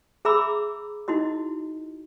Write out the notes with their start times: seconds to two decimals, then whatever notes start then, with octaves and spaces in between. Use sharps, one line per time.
0.25 G#4 E5 A#5 B5 D6 E6
1.08 D#4 E4 F#4 D#5